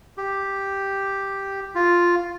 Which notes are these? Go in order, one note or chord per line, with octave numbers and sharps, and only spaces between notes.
G4
F4